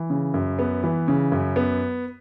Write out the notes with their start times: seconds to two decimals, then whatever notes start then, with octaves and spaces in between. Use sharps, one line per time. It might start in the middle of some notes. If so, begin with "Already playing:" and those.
Already playing: E3
0.10 C#3
0.34 F#2
0.59 B3
0.84 E3
1.08 C#3
1.32 F#2
1.56 B3